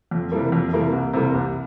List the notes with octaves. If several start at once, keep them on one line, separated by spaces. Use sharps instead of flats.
F2
C3 E3 G3 A#3
F2
C3 E3 G3 A#3
C2
C3 E3 G3 A#3
C2